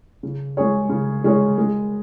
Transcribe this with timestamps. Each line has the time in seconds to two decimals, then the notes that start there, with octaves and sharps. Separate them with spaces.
0.23 C#3
0.57 G#3 C#4 G#4 C#5
0.89 C#3
1.24 G#3 C#4 G#4 C#5
1.58 G#3